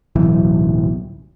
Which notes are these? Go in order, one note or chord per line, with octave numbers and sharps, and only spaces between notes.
D1 B1 E3